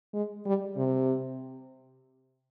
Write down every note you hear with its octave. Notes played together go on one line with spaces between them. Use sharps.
G#3
G3
C3